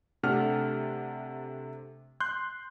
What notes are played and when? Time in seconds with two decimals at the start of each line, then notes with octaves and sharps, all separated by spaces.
0.23 C3 A3 D4 F#5 F6
2.20 C6 F#6 G6